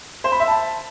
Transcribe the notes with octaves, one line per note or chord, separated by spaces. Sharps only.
C5
B5
E5
A5